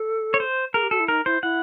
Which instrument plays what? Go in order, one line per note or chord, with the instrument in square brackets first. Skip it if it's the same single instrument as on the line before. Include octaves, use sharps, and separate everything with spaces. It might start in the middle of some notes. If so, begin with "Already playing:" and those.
Already playing: [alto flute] A4
[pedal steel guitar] C#5
C5
[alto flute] G#4 [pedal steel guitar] A#4
[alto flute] G4
[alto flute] F#4 [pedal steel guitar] A4
[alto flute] E4
[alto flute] D#4 [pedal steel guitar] A#4
[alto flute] E4 [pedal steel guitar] C5
[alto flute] E4 [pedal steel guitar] F#5